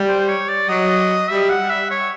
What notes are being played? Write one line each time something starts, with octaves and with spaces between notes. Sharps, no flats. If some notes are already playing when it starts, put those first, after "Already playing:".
Already playing: G3
C5
C5
C#5
D5
F#3 D#5
G3 E5
F#5
G3
E5
C#5